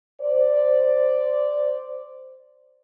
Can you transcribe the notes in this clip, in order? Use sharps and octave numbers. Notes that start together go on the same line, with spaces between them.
C5 D5